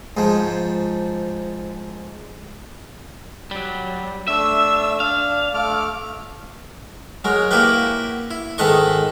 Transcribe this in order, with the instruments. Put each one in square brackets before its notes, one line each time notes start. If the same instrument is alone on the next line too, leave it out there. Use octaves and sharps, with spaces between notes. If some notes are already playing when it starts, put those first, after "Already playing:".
[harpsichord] G#2 F3
[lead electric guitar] F#3 G3
[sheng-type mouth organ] A3 D4 E6 [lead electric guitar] E5
[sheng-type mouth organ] D4 [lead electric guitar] F5
[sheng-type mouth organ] A3 D6 F6
[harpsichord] F#3 G#3 A#4
A#3 E4 F#4 G4 A#4 B4
E4
G#2 D#3 A4 B4 D#5 C#6